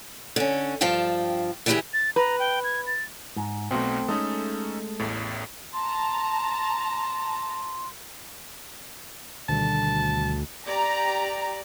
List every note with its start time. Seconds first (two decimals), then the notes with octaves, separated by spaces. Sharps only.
0.36 D3 C#4
0.81 G2 F3 F5 G5 A5
1.66 D3 E3 E4 F4 G4 G#4
1.93 A6
2.16 B4 A#5
2.39 G5
2.64 G#6
2.87 A6
3.36 G#2
3.71 B1 B2 A3 C4 F#4
4.08 G#3 A3 C#4 D#4 A4
5.00 A1 E2 A2
5.73 A5 A#5 C6
9.49 D2 B2 D#3 G3 A5
10.66 G4 D5 A#5